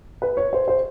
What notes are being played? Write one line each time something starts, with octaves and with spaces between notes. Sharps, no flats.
B4
C#5
C5
C5